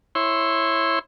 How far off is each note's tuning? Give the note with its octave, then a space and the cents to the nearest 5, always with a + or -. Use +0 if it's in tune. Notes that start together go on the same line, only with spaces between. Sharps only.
E4 +0 C#5 -20 C6 +0